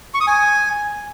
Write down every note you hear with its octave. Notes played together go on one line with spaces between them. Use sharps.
C#6
D#6
G#5